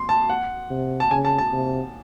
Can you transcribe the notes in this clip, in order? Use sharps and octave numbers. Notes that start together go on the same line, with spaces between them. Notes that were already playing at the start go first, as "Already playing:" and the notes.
Already playing: C6
A5
F#5
C3
A5
C#3 G#5
A5
A5
C3